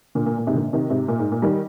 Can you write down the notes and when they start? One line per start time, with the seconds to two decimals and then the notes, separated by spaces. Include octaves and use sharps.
0.15 A#2 D3
0.26 A#2
0.38 A#2
0.47 G#2 C3
0.55 A#2 D3
0.73 C3 D#3
0.90 G#2 C3
1.08 A#2
1.19 G#2
1.32 A#2
1.42 D#3 G3